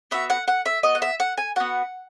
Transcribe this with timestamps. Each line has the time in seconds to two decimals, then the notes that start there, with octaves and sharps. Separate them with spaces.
0.11 B3 F#4 E5
0.30 F#5
0.48 F#5
0.66 E5
0.83 B3 F#4 D#5
0.95 F#5
1.02 E5
1.20 F#5
1.38 G#5
1.56 B3 F#4 F#5